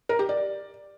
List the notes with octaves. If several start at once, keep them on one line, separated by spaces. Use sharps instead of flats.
A#4
G4
D5